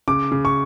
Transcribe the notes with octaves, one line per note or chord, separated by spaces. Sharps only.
C#3 D6
C#3
C#6